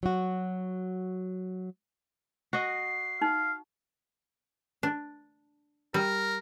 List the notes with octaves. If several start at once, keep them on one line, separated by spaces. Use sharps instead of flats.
F#3 F#4
F#4 D#5 C7
D#4 F5
D4
G3 A#4